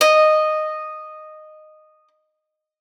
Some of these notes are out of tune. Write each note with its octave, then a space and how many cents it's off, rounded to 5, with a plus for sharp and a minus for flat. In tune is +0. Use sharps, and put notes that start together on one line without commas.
D#5 -10